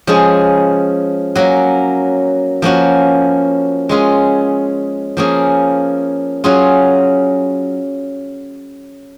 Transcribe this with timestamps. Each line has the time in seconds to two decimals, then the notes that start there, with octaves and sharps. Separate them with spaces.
0.07 F3 G#3 C#4 G#4
1.36 F#3 A#3 C#4
2.62 F3 A#3 C#4 F#4
3.89 G#3 C#4 F4 G#4
5.17 F3 A#3 C#4 G#4
6.44 F#3 C#4 F4 G#4